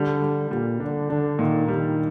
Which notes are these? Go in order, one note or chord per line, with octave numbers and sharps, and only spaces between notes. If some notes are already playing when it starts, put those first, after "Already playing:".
Already playing: D3 G3
G3
A#2 G3
D3 D4
D3 D4
A#2 D#3
D#3 G3